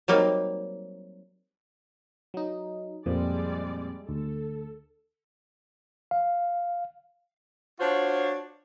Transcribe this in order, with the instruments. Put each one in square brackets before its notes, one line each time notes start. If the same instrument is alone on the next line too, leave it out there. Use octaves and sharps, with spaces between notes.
[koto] F#3 G3 A#3 C4 D#4
[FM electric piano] F#3 D#4
[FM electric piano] F2 A#2 F3 [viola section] G3 G#3 D5
[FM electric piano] D2 [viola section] A4
[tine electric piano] F5
[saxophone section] D4 F4 F#4 C5 C#5